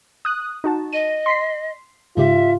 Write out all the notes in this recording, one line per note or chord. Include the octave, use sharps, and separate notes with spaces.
D#6 F#6
D#4 F#4 A5
D#5 D#7
C6 B6 C7
G#2 C#3 F4 G4 E5